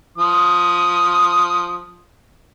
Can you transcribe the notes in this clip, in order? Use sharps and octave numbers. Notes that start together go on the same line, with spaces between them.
F3 D#6